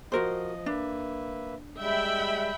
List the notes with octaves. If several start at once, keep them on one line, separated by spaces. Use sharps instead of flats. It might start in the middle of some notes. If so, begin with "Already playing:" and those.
F3 F#4 A#4 C5 D#5
A#3 D4 B4 E5
G3 G#3 E5 G5 B5